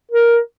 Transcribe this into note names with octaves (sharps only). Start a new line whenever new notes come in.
A#4